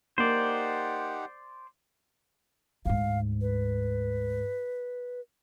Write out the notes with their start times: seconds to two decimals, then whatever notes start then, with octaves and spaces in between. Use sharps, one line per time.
0.18 A#3 D#4 G4 C5 D5 F#5
2.85 D2 G#2 F5
3.41 B4